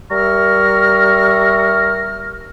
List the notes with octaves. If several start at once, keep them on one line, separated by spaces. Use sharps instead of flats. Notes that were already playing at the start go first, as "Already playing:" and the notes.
G3 A#4 E5 A#5 C#6 F6